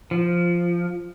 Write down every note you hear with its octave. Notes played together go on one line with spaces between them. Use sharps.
F3